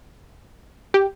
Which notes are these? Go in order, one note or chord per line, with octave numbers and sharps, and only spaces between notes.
G4